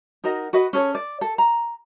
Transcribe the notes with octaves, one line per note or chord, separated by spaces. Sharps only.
D#4 F#4 A#4 D#5
F#4 B4 D#5
C#4 G#4 A4 C#5
D5
A4
A#5